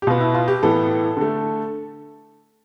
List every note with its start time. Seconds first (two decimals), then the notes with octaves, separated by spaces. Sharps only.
0.02 G4
0.07 B2 B3 F4
0.20 E4
0.35 F4
0.48 G4
0.63 A2 E3 B3 A4
1.17 D3 A3